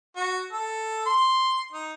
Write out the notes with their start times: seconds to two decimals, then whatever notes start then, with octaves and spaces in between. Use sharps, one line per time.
0.16 F#4
0.52 A4
1.06 C6
1.72 D#4